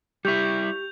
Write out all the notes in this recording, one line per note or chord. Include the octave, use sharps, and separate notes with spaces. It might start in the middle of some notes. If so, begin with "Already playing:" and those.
G3 E4 G4 C#6 G6 F7